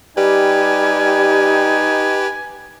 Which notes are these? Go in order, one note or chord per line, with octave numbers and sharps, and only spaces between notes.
G3 D#4 G4 B4 G#5